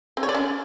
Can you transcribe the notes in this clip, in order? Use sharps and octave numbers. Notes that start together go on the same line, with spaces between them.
C4
C#5
D5
C#4